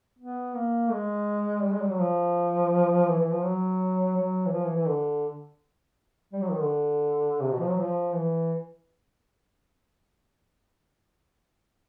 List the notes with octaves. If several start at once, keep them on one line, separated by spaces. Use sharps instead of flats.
B3
A#3
G#3
G3
G#3
G3
F#3
F3
E3
E3
F3
F#3
F#3
E3
F3
E3
E3
D3
G3
F#3
D#3
D3
C3
B2
F3
F#3
F3
E3